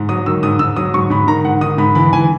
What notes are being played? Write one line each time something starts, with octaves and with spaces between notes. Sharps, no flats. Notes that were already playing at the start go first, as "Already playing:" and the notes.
Already playing: G#2
F#3 D#6
D#3 E6
G#2 D#6
G#2 E6
F#3 D#6
G#2 C#6
G#2 B5
D#3 A#5
G#2 F#5
D#3 D#6
G#2 B5
E3 B5
E3 G#5